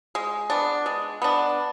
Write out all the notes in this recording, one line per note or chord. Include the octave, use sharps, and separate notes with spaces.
G#3
B3 D4
G#3
B3 D4